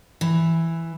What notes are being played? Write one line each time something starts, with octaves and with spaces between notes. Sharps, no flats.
E3